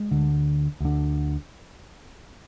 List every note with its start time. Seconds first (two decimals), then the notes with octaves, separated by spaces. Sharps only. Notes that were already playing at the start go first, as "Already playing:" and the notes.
Already playing: G#3
0.11 D2 D3
0.80 D2 D3